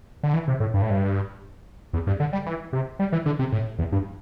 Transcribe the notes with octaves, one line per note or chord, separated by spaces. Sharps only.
D3
E3
C3
A2
G2
A2
G2
E2
G2
D3
G3
E3
C3
G3
E3
D3
C3
A2
E2
G2